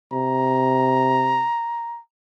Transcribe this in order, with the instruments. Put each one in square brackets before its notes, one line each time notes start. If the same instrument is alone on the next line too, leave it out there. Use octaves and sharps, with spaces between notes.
[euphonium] C3 [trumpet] A#5